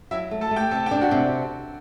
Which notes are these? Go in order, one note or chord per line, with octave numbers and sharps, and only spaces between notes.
F#3 E4 E5
A3
A4 A5
A3
G4 G5
C3 A4 A5
G4 G5
D4
F#4 F#5
C3